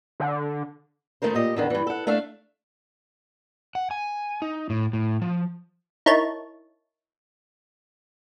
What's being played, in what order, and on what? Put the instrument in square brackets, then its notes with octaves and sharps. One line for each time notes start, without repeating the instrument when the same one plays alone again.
[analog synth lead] D3
[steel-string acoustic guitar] D#3 A3 D#4 A#4 C5
A#2 G4 D#5
E2 D3 D#3
G2 E3
A4 F#5
A3 D4 A4 E5 F5
[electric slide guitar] F#5
G#5
D#4
A2
A2
F3
[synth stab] D#4 E4 A#4 C#5 A5